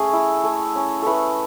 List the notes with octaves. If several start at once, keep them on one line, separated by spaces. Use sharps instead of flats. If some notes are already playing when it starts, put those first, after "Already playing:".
Already playing: A3 C#4 G#4 C#5
E4
A3
C#4
A3 A4 B4